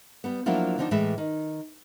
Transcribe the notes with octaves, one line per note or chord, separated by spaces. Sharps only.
G3 B3
F3 F#3 A#3 D4 E4 F4
D3 D#3 F3 C4 D4 D#4
A2 E3 G#3 E5 A5
D#3